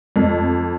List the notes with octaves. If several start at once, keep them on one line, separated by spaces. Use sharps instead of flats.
F2